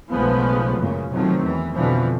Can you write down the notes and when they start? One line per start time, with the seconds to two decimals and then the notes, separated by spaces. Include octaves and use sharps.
0.10 B1 C#3 F3 G#3 A3 B3
0.78 F#2 A#2 C#3
1.12 C3 D#3 F3 F#3 A3 C4
1.43 E2 E3
1.75 F2 B2 D3 E3 F3